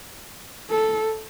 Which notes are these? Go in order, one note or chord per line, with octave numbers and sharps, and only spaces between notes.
A4